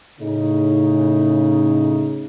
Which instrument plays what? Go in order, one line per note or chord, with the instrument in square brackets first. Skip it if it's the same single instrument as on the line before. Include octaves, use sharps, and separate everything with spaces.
[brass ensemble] A2 C#3 D#4